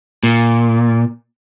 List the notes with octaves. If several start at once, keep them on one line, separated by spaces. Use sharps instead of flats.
A#2